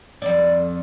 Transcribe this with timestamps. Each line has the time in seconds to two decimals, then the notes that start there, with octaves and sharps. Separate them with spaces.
0.22 F2 D5